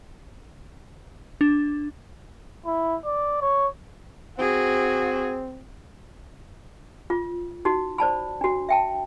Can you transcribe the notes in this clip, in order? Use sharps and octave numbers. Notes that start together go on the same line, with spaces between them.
D4
E4
D5
C#5
C4 F#4 G#4
F4
D#4 F#4
C5 D5 A5 B5
D4 F#4
E5 G5 A5